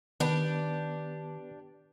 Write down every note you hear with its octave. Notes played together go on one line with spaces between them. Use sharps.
D#3 B3 D4 G4 B4